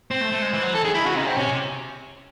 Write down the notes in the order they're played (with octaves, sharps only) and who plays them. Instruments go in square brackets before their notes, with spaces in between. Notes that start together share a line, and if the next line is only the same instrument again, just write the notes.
[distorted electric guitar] C4 [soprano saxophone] C5
[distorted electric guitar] A3
A3
G#3
E3
F#3
[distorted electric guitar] E3 [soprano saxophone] A4
[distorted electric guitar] D#3 [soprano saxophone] G#4
[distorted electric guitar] D#3 [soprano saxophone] E4
[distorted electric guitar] C#3 [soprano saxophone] F#4
[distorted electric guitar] C3 [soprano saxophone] D#4
[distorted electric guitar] C#3
[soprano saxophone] C4
[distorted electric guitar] C3 [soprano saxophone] C#4
[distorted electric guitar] C3